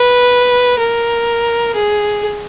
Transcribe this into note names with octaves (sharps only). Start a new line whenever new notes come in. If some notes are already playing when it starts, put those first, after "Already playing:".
Already playing: B4
A#4
G#4